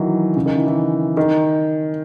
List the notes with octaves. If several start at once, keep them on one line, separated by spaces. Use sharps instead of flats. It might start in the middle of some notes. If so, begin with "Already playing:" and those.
Already playing: D#3 E3 F#3
C#3
D#3
E3
E3
D#3